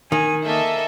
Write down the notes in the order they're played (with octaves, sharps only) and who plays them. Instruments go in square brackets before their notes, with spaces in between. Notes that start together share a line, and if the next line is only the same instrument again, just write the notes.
[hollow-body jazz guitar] D#3 [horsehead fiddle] G#5
[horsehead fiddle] A#3 [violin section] A4 D#5 E5